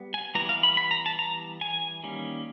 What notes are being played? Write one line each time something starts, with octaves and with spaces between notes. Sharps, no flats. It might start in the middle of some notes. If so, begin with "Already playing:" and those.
Already playing: G3 B3
G#5
E3 G3 B3 A#5
F5
B5
B5
A#5
A5
A#5
G#5
D#3 G3 A#3 C#4